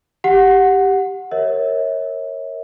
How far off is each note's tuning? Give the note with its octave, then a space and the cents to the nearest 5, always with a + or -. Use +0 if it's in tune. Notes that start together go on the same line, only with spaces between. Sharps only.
G4 +0 F#5 -10
A#4 +0 C#5 -20 E5 -40